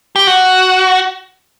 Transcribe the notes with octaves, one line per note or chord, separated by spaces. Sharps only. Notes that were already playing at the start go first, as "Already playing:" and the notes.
G4
F#4